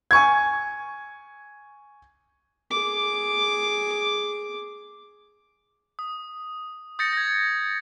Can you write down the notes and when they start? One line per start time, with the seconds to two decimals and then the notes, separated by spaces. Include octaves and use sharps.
0.11 G#5 C#6 G#6
2.70 G#4 D6
5.99 D#6
6.99 D#6 G6 A6 A#6 C#7
7.13 G#6 A#6